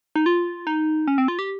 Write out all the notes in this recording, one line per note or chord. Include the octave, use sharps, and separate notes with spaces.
D#4
F4
D#4
C#4
C4
F4
G4